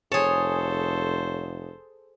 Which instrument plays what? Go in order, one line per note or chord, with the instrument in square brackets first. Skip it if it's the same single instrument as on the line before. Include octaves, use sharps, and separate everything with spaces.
[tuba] F1 [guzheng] G#4 A5 [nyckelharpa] A4 C5 [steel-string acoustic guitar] C#5